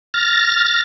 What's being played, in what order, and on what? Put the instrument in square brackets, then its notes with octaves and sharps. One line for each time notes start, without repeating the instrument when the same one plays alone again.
[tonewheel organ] F6 A6 A#6